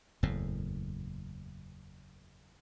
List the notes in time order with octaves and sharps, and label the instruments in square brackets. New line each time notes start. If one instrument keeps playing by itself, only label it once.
[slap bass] F#1 E2 A2